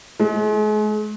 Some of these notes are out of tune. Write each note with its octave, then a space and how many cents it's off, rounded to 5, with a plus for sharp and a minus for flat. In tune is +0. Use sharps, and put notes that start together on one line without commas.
G#3 +40